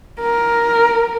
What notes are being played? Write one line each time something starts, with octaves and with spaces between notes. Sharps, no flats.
A#4